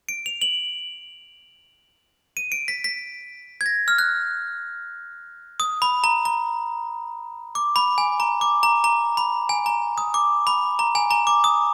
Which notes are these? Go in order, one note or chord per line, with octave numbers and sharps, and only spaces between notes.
D7
F7
F#7
D#7
D7
B6
B6
G#6
A#6
F6
F#6
D#6
B5
A#5
A#5
D6
B5
G#5
A#5
D6
A#5
A#5
B5
G#5
A#5
D#6
D6
B5
A#5
G#5
A#5
D6
D#6